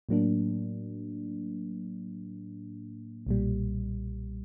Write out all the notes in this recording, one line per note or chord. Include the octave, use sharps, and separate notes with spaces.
A2 F#3 A#3 D4
B1 A#2 G3